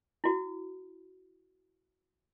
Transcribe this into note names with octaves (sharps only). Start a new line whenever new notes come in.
E4 F#4